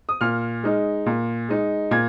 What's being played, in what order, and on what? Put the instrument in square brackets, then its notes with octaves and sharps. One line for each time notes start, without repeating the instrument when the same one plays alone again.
[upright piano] D#6
A#2 F6
G#3 D#4
A#2
G#3 D#4
A#2 G#6